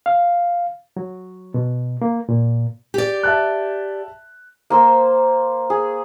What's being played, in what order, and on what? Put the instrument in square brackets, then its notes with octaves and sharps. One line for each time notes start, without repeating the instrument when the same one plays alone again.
[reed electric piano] F5
F#3
B2
A#3
A#2
[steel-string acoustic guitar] G4 D5
[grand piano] E5 A5 F#6
[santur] A#3 C5 E6
G#4